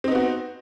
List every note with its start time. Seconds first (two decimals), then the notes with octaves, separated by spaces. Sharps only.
0.04 C4
0.08 D#4
0.11 B3
0.15 F#4